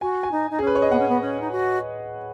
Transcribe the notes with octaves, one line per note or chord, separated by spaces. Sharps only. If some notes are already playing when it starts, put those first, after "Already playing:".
F#4 G#5
G#5
D#4
D#4
C#4 G#4
B4
C#5
D#5
B3 F#5
C#4
B3
C#4
D#4
F#4